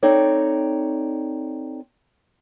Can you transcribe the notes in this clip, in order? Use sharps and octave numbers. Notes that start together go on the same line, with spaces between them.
C4 D#4 A4 C#5 D5